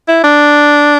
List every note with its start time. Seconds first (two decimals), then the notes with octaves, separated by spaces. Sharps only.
0.08 E4
0.24 D4